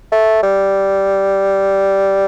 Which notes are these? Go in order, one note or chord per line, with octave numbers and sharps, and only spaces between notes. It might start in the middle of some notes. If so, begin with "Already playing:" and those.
A3
G3